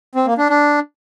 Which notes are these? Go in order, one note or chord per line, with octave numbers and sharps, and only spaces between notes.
C4
A#3
D4
D4